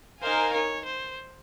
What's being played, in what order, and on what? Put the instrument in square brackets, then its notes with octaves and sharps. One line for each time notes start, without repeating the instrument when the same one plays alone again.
[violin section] D#4 A#4 F5 G#5 [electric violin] C5
[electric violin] C#5
C5